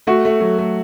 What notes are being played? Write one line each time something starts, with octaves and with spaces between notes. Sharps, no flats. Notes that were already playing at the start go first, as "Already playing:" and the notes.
A3 F#4
A3
F#3
A3